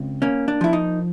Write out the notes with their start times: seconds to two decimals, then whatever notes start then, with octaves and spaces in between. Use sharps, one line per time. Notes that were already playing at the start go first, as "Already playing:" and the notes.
Already playing: C#2 C4
0.22 A#3 C#4
0.48 D4
0.61 F3 E4
0.73 D#4